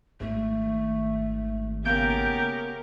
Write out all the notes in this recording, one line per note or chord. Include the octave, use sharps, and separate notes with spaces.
G#1 A3
C#3 A#3 B3 G4 A#4 G6 D7